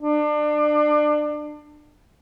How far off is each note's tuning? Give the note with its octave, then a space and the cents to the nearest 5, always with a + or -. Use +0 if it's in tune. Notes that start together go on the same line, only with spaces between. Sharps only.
D4 +30